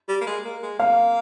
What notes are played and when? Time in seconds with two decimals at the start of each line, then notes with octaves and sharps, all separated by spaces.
0.08 G3
0.21 A#3
0.27 G#3
0.45 A#3
0.62 G#3
0.79 A#3 F5